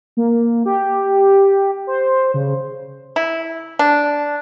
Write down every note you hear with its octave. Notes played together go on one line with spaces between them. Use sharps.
A#3
G4
C5
C#3
E4
D4